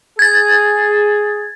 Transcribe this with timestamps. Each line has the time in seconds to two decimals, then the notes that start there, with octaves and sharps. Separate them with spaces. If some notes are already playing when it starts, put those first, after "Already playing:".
0.19 G#4 G#6 A6